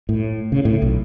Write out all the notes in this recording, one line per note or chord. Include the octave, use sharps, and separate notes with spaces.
A2
C#3
A2
B1